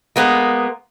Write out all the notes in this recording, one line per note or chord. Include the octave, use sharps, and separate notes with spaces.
G#3 A#3 B3